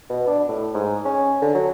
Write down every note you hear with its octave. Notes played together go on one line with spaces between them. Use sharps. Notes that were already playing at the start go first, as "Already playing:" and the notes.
B2
D4
A2
G#2
C#4
D3
F#3